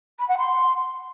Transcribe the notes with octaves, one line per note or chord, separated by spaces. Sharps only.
B5
F#5
C6